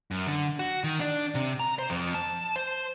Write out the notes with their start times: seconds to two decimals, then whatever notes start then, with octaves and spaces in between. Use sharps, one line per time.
0.11 F#2
0.27 D3
0.59 F#4
0.84 D#3
1.00 D4
1.35 C3
1.60 A#5
1.79 C5
1.90 F2
2.15 A5
2.56 C5